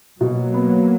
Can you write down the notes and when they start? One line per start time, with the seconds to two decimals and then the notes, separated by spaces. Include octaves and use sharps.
0.20 B2 F#3 A#3
0.54 B3